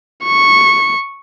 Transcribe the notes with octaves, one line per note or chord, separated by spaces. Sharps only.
C#6